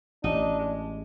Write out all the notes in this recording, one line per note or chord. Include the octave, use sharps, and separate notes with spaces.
A1 D4 D#4
G#3